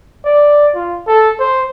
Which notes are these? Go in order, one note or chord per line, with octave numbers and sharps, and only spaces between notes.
D5
F4
A4
C5